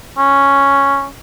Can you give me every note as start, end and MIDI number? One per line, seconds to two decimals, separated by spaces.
0.18 1.07 61